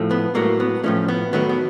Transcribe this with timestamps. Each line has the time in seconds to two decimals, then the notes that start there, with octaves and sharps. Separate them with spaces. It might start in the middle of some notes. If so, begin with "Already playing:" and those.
Already playing: A2 F3 A3
0.11 B3
0.35 A2 F#3 A3 A#3
0.60 B3
0.84 A2 F3 A3 C#4
1.08 B3
1.33 D#3 F#3 A3 B3
1.49 B3